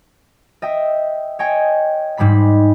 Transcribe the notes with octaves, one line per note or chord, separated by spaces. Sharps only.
D#5 E5 G5
C#5 D#5 G5 G#5
G#2 G3 G#3 B5 B6